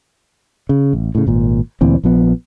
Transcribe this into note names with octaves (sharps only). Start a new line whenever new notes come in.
C#3
A1
A2 C#3
G#1 A#2
D2 A#2 E3 C4
A#1 F3 B3